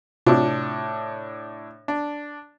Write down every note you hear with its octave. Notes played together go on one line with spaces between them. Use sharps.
A2 C3 D4 F4 F#4
D4